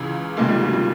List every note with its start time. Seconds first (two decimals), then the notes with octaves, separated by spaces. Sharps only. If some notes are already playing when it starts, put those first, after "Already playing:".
Already playing: C#2 C#3 E3
0.37 F1 D#2 C#3 G#3 A#3
0.49 F3 G3
0.61 F#3
0.73 F3 G3